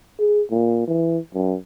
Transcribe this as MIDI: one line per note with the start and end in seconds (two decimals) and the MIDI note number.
0.19 0.42 68
0.51 0.87 46
0.87 1.18 52
1.34 1.56 42